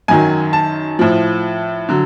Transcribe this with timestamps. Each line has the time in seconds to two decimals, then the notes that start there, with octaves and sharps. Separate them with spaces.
0.08 F#2 D#3 F#3 G#5
0.53 A5
0.99 A2 F3
1.89 D3 F#3